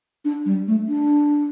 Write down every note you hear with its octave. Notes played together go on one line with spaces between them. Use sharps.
D4
G3
A3
D4